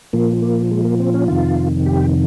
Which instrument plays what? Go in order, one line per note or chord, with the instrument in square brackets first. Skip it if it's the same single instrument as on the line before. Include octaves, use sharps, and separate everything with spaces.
[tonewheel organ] A#2 F3 A#3
A#3
G#3
A#3
C4
C#4
F2 C3 D#3 F4
G4